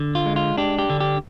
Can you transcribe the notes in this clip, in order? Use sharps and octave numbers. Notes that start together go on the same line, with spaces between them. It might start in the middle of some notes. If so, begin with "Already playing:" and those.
Already playing: D3
F4
G#3
F4
D4 G4
G4
D3
G4